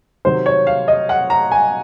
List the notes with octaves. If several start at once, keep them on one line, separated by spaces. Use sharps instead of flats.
C3 D#3 F#3 C5
C#5
F5
D#5
F#5
A#5
G#5